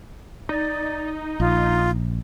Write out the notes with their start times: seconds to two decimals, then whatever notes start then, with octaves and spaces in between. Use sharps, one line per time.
0.49 D#4 D5
1.40 A#1 F4